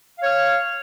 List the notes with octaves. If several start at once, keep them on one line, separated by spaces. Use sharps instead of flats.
C#5 F5 F6